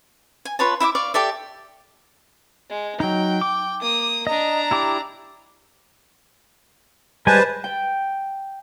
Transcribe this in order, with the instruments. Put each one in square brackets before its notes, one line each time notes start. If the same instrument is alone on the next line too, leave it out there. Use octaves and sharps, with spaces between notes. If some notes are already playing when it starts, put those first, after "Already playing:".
[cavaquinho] G#5
F4 B4 C#5 A5
E4 E5 G5 D6
D5 F5 C#6
G4 A4 D5 E5
[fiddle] G#3
[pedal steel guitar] F#3 D#4 [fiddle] G5
[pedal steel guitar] D6
[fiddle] A#3 D#6
[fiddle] D4 A#5 [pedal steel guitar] D#5
[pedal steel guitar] E4 G4 D6
[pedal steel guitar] G3 G#3 G#5 [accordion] B4 C5 A5
[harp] G5